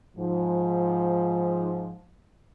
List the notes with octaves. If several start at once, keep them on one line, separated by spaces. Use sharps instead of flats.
G#2 F3